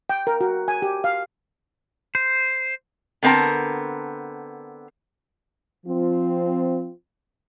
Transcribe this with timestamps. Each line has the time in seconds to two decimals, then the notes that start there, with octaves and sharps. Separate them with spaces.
0.09 G5
0.27 A#4
0.41 F#4
0.68 G#5
0.82 G4
1.04 F5
2.15 C5
3.23 D3 B3 C4 A#4 A5
5.86 F3 C4 F4